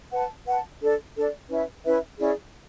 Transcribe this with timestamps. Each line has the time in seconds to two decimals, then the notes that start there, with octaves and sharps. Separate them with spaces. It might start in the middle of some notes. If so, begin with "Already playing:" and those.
0.11 B4 F#5 A5
0.45 B4 F#5 A5
0.81 D4 A4 D5
1.16 D4 A4 D5
1.50 C#4 E4 B4 E5
1.84 C#4 E4 B4 E5
2.19 C#4 E4 G#4 D5